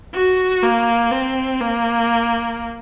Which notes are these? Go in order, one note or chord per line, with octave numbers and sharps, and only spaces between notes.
F#4
A#3
C4
A#3